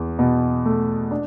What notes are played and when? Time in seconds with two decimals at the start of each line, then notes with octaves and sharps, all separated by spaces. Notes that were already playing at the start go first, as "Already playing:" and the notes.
Already playing: E2
0.19 B2
0.66 A3
1.11 D4